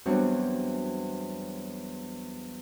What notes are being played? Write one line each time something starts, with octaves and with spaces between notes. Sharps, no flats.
E2 F#3 G3 C4 D4 C#6